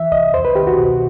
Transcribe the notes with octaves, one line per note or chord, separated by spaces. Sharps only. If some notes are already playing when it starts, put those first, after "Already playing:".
Already playing: E3 E5
C2 D#5
E2 C5
B4
D#3 G4
F#4
B2